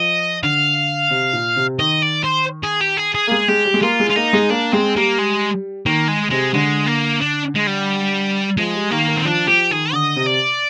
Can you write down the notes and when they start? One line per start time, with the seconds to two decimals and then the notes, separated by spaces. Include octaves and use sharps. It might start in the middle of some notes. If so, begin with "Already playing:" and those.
Already playing: F3 D#5
0.43 D3 F5
1.10 C3
1.33 A#2
1.56 C3
1.79 D#3 D#5
2.02 D5
2.24 C5
2.63 G#4
2.81 G4
2.97 G#4
3.14 G#4
3.27 A#3
3.32 G#3
3.48 G#3 G4
3.65 G3
3.74 G#3
3.82 A#3 F4
4.00 G#3
4.10 F4
4.16 A#3 D#4
4.33 G#3
4.50 A#3 D4
4.72 G#3 C4
4.96 G3 A#3
5.18 G#3
5.86 D#3 A#3
6.08 G#3
6.31 C3 G#3
6.54 D3 G#3
6.87 A#3
7.22 D4
7.56 G#3
7.67 G3
8.57 F3 G#3
8.75 G3
8.91 D#3 A#3
9.09 D#3
9.17 C4
9.25 F3 D4
9.47 F3 G4
9.70 D#3 G#4
9.93 D3 D#5
10.16 C3
10.27 D5